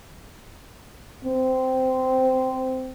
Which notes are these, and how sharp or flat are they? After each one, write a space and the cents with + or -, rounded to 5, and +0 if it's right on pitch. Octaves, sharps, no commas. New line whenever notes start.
C4 -15